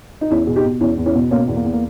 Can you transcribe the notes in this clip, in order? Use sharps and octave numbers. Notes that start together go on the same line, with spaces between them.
D#4
E2 C#4 E4
B2 G#4
D#4 G4
B2
E2 C#4 E4
E2
C#4 E4
B2
B2 A#3 C#4
E2
A#3
E2
A#3